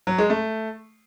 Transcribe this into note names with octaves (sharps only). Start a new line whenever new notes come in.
F#3
G#3
A3